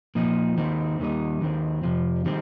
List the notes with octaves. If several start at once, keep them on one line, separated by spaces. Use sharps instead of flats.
A#2 F3 C4 D#4
D#2 D#3 C4 D#4
D#2 D#3 G3 D#4
D#2 D#3 C4
F2 C3 F3
D#3 G3 C4